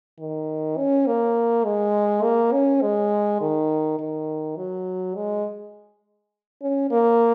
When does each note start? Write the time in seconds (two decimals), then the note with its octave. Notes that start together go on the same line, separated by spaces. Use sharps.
0.19 D#3
0.77 C#4
1.07 A#3
1.65 G#3
2.23 A#3
2.52 C#4
2.82 G#3
3.41 D#3
3.99 D#3
4.57 F#3
5.15 G#3
6.62 C#4
6.91 A#3